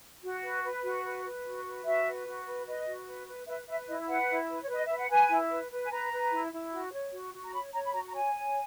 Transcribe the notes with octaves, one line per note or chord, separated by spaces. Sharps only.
F#4
B4
B4
F#4
B4
B4
F#4
B4
F#4 E5
B4
F#4
B4
B4 D#5
F#4
B4
B4
B4 E5
B4 E5
E4 D#5
B4 F#5
E4
B4
C#5
B4 D#5
B4 E5
F#5
B4 G#5
E4
B4
B4
G#5
B4 A#5
B4
E4
E4
F#4
C#5
F#4
F#4
A#5
C#5 B5
C#5 A#5
B5
F#4 A#5
A#5
C#5 G#5
C#5